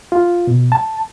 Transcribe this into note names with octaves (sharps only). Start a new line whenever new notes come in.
F4
B2
A5